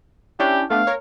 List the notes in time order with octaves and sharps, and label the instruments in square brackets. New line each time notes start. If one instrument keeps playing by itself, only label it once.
[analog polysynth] C#4 D4 E4 [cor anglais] G4
[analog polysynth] A3 B3 D4 [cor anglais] F5
[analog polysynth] A#4 C#5